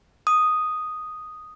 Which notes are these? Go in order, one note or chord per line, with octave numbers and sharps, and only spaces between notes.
D#6